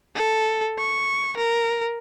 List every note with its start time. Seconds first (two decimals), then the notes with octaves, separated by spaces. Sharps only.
0.15 A4
0.78 C#6
1.37 A#4